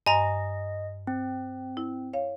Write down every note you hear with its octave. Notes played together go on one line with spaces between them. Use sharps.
G2 D#5 G#5 A#5
C4
E4
C#5 F5